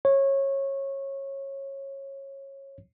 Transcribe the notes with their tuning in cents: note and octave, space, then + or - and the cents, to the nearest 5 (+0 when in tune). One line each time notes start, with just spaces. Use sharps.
C#5 -20